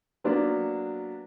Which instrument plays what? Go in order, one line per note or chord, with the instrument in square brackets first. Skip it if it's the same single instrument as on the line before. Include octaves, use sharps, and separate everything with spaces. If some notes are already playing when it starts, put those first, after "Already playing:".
[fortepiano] F#3 A#3 B3 D4